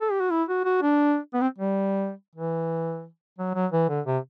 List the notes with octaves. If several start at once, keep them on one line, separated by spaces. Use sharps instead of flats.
A4
G4
F#4
E4
F#4
F#4
D4
B3
C4
G3
E3
F#3
F#3
E3
D3
C3